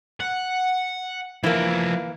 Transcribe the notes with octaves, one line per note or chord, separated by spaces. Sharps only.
F#5
E3 F3 A#3 E5